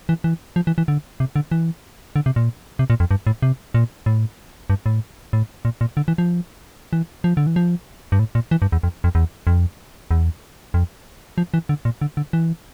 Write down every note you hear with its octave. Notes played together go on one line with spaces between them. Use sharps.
E3
E3
F3
E3
E3
D3
C3
D3
E3
D3
C3
A#2
C3
A#2
F2
G2
A2
C3
A#2
A2
G2
A2
A2
A#2
A#2
D3
E3
F3
E3
F3
D3
E3
F3
G2
A2
A#2
E3
G2
E2
F2
F2
E2
F2
E2
F2
F3
E3
D3
A#2
D3
D3
E3